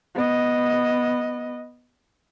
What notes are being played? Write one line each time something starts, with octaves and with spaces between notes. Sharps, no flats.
B3 D#5